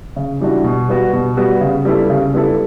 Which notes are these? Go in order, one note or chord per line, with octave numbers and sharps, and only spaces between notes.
C#3
E3 G3 D4 F#4
B2
G3 B3 F#4
B2
G3 B3 F#4
C#3
G3 B3 E4 A4
C#3
G3 B3 E4 A4